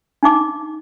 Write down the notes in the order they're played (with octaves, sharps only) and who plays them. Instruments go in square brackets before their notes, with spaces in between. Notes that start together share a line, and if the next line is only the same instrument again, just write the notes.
[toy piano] D4 D#4 D6